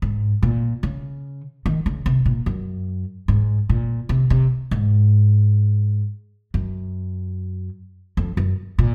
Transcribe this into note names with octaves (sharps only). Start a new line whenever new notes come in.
G#2
A#2
C#3
D#3
C#3
C3
A#2
F#2
G#2
A#2
C3
C3
G#2
F#2
F2
F#2
A#2